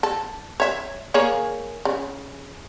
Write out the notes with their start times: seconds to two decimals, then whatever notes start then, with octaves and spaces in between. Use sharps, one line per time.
0.03 A4
0.60 C#5 E5
1.14 A#3 G#4 C#5
1.85 C#3